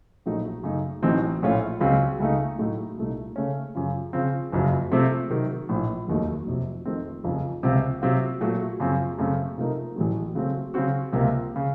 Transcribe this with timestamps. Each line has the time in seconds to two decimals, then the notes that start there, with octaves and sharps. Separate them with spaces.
0.26 A#1 A#2 F#3 A3 D#4
0.64 F#2 C#3 A3 D#4
1.02 A1 A2 F#3 C4 D#4
1.42 A#1 A2 A3 C#4 F4
1.81 C#2 C#3 F#3 C4
2.20 C#2 C#3 A3 D#4
2.58 A2 F#3 A3 D#4
2.98 C2 A#2 A3 D#4
3.36 C#3 A3 C#4
3.75 F#2 C#3 F3
4.13 C#3 F3 C4
4.52 F#1 F2 C#3 F#3
4.91 C3 F3 A3 C4
5.30 C3 D#3 F#3
5.69 A#1 A2 F3
6.08 F1 D#2 D#3 F#3 A3
6.46 F1 F2 C3 F#3
6.85 F2 D#3 A3 C4
7.24 F1 F2 C#3 F3
7.63 C#2 C3 F3 C4 F4
8.02 C3 F#3 C4 F4
8.41 A#2 F#3 A3
8.80 F#2 C#3 F3 C4
9.19 F#2 C#3 A3 C4
9.57 C3 F3 A3 D#4 A#4
9.96 A1 A2 F#3
10.35 C#3 F#3 A3 C4
10.74 C#3 F#3 C4 F#4
11.13 C#2 C3 F3 A#3
11.56 C#3